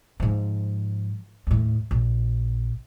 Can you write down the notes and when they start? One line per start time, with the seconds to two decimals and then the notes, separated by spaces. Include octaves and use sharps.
0.20 G#2 F3
1.47 D#2 A2
1.91 A#1